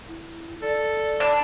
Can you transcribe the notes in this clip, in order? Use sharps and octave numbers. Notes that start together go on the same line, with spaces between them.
E4
A4 D5
D4